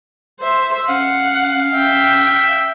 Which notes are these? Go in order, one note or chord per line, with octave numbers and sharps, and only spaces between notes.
C5 E5
C#4 F5 F#5
E5 G5